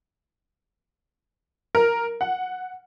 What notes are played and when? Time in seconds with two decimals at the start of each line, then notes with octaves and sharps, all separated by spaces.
1.75 A#4
2.21 F#5